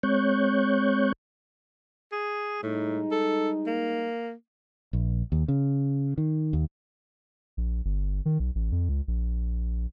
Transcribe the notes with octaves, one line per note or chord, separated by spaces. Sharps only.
G#3 C4 C#5 C#6 F#6 G6
G#4
A2 G3 G#3 D#4
A4
A#3
A#1
D#2
C#3
D#3
D#2
A#1
G1
D#3
B1
A1
F2
C#2
A#1